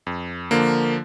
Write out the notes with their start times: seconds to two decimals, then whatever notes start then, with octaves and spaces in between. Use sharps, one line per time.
0.07 F2
0.51 D3 F3 A#3